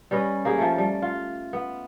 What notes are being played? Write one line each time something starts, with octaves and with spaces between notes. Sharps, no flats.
G3 C#4 B4 D#5
A#3 G4 G#4
F3 A3
G3
F4
B3